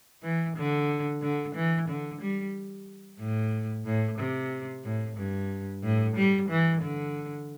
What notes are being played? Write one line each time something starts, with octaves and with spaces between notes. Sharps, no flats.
E3
D3
D3
E3
D3
G3
A2
A2
C3
A2
G2
A2
G3
E3
D3